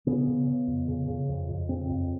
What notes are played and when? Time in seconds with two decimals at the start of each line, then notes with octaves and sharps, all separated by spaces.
0.07 C#3 B3
0.27 C#3
0.47 C#3
0.67 F2
0.88 C#3
1.08 C#3
1.29 F2
1.49 F2
1.69 C#3 C4
1.89 F2